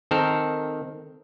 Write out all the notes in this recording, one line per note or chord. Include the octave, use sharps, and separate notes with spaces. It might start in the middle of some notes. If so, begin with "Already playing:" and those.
D#3 C4 A4 A#4